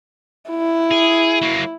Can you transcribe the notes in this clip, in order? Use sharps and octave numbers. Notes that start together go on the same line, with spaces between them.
E4
G#4
F#3 A#3